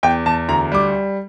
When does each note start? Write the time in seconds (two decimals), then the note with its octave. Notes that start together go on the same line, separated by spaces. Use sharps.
0.03 E2 G5
0.26 E2 A5
0.49 D2 A#5
0.72 G3 D6